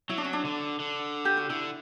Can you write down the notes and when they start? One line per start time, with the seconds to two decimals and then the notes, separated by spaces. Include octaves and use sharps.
0.09 F#3 E4
0.18 D4
0.24 C#4
0.33 D4
0.45 D3
0.80 D3
1.25 G4
1.37 F#4
1.50 D3 E4